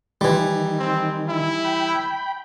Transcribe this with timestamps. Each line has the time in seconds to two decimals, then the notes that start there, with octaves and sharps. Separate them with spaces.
0.21 D#3 E3 G3
0.79 C4
1.29 E4
1.65 G5 B5